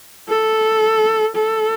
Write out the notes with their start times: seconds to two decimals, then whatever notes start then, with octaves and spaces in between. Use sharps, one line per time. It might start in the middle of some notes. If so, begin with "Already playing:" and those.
0.29 A4
1.35 A4